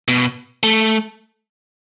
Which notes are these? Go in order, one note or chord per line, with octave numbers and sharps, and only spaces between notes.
B2
A3